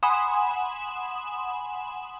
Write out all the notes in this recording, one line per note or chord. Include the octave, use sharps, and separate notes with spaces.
F#5 G#5 B5 C6 D#6 E7